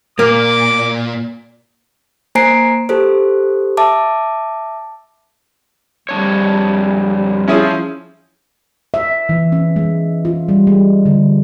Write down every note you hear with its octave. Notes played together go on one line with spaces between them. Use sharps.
A#2 A#3 D6
A#3 C5 G#5 A#5 C7 D7
G4 A4 C5
E5 A5 D6
F2 G3 D4 C#5
F3 C#4 E4 G#4
E5
E3
C#4
G#3
F4
G3
G#3
D3